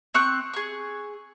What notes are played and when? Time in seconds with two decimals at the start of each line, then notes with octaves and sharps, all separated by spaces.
0.14 C4 C#6 F#6
0.53 G#4 C#6